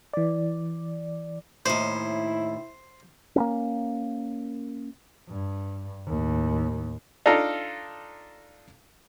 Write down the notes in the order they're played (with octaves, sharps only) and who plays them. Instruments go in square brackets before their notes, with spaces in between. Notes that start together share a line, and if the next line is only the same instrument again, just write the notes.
[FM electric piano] E3 D5
[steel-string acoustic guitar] D#2 A2 [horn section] E4 [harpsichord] C5
[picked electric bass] A#3 B3 C#4
[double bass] G2
D#2 A2
[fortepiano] D4 D#4 F4 A4 F5 A#5